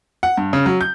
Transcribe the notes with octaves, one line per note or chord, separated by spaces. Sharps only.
F#5
G2
C#3
F#3
G6